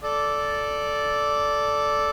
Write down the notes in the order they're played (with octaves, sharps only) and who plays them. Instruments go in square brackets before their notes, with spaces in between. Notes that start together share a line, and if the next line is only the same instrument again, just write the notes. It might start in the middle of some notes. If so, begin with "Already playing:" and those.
[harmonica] A4 D5